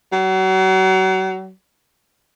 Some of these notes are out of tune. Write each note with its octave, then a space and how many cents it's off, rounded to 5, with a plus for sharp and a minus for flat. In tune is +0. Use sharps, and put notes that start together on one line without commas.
F#3 +35